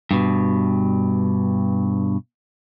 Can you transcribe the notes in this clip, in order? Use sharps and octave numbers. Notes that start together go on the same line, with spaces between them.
G2 B2